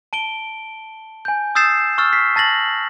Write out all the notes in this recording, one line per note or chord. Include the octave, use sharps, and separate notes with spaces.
A5 D7 G7
G#5 G6
D#6 E6 G6 A6 C7 E7
C#6 E6 F6 A6
B6 C7
A5 A6 A#6 F#7